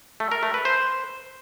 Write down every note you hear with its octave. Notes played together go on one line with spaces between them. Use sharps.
A3
A#4
A3
B4
C5